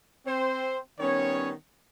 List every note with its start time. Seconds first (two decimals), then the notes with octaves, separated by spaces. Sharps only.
0.26 C4 C5
1.00 D#3 G3 B3 C#4 C#5